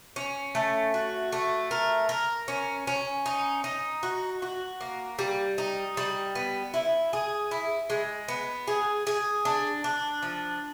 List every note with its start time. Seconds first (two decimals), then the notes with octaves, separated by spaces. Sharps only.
0.16 C#4
0.55 A3
0.94 F#4
1.32 A3
1.71 A#4
2.09 A#4
2.48 C#4
2.87 C#4
3.26 D#4
3.64 D#4
4.03 F#4
4.42 F#4
4.81 A#3
5.19 G3
5.58 D#4
5.97 G3
6.35 B3
6.74 E4
7.13 G#4
7.51 E4
7.90 G#3
8.28 B3
8.67 G#4
9.07 G#4
9.45 D4
9.84 D4
10.23 F3